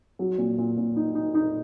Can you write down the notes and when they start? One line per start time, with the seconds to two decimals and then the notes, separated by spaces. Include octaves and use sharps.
0.19 F#3
0.38 A#2
0.58 A#2
0.77 A#2
0.96 D#4
1.15 D#4
1.34 D#4